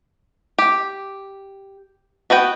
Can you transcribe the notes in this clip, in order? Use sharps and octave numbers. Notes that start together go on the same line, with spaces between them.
G4
B3 F#4 B4 G5